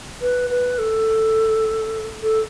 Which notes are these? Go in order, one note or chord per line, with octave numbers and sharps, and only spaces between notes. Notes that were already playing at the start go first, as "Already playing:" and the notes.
B4
B4
A4
A4